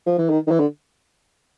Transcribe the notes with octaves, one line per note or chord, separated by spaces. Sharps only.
F3
E3
D#3
D#3
E3
D3